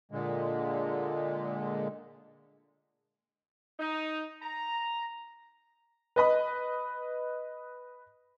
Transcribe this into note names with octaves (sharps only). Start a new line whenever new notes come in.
A#2 D3 G#3
D#4
A#5
B4 D#5 B5